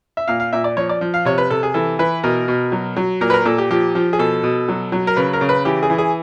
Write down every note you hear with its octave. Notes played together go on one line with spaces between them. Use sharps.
E5
A#2 F5
F5
A#2 E5
D5
F3 C#5
D5
F3
F5
C3 C#5
B4
C3 A4
G#4
E3 A4
E3 B4
B2 A#4
B2
F#3
F#3
A#2 A#4
B4
A#4
A#2 A4
G4
F3 G4
F3
G#4
B2 A4
B2
F#3
F#3
A#4
C#3 B4
A#4
C#3
B4
E3 G4
G#4
E3
G#4